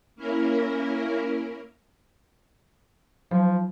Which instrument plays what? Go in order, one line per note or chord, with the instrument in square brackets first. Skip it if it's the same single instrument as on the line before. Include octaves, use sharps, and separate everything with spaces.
[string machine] A#3 C#4 E4 A#4
[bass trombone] F3 [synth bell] F#3